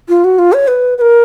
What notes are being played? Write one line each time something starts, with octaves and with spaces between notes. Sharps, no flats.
F4
F#4
F4
C#5
B4
B4
A#4